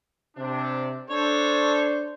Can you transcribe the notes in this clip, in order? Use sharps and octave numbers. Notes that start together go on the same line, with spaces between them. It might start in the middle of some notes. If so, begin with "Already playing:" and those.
C3 D4
D4 A4 C5 C#5